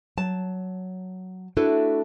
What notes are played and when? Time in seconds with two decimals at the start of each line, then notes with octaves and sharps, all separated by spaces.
0.17 F#3 A5
1.57 A3 D4 E4 F#4 A4 B4